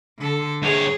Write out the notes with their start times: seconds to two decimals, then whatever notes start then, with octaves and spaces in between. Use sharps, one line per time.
0.18 D3 A4
0.63 G2 G#4 C#5